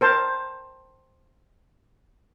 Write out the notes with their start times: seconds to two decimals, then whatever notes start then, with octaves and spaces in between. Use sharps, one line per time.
0.01 A#4 C5 A5